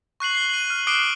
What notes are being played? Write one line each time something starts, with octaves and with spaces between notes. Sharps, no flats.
C#6 F#6 C7 F#7
C7 G7
D#7 F#7
F6
D6 D#6 F#6 C7 D7 G7